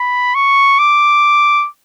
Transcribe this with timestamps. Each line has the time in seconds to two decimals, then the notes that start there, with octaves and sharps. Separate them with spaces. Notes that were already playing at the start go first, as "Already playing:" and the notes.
Already playing: B5
0.35 C#6
0.79 D6